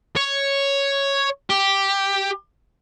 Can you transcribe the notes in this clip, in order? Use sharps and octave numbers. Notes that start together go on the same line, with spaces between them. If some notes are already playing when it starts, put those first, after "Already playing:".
C#5
G4